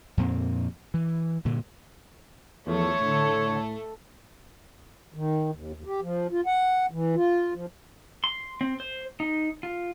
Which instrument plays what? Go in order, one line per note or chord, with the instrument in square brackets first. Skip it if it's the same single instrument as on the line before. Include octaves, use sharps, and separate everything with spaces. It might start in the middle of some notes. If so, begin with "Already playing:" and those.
[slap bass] F2 A#2 C4
E3
G2 A#2 D3
[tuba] E2 [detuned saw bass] F3 [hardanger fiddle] A3 A4 [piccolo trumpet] C#5
[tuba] A2 [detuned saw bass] D3
[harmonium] D#3
D#2
D#2
G4
F3
F4
F#5
E3
F4
F3
[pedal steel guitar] C6
C4
C5
D#4
F4